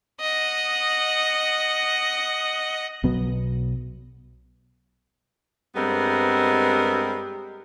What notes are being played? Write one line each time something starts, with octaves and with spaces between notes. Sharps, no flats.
D#5 F#5
B1 B2 F#3 B3
G2 G3 G#3 B3 C4 A#4